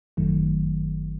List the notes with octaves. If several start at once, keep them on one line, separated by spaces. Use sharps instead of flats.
G1 F#2 D#3 F#3 A3